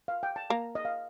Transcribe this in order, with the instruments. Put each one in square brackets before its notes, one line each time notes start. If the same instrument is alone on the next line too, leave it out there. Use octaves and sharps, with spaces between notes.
[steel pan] F5
G5
A5
[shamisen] A#3 [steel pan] A#5
[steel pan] D#5
F5